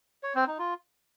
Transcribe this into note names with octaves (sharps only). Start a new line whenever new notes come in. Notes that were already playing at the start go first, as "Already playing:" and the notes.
C#5
C4
D#4
F4